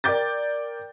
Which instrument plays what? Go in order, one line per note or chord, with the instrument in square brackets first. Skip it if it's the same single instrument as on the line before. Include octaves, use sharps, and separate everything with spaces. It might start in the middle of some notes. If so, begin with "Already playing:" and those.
[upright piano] A#4 D5 G5 D6 G6 A6